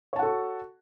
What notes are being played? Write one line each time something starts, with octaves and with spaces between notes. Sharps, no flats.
F#4 A4 C#5 F#5 A5